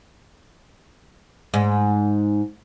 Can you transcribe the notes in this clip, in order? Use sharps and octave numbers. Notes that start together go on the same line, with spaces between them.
G#2